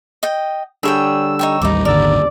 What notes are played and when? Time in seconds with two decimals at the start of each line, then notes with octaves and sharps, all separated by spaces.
0.23 D#5 G5
0.83 D3 G3 D4 G#4 C#5 G5 E6
1.39 D#4 C#5 G5
1.62 A1 D#2 G3 D#4 D6
1.85 D#1 G#1 D#2 D3 A#4 D5 E6